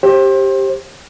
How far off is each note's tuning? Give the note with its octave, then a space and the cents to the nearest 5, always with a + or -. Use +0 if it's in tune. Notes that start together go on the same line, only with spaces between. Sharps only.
G4 +0 C5 +30